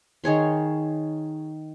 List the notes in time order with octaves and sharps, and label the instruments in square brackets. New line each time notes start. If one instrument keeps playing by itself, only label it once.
[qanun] D#3 G#4 C#5 C6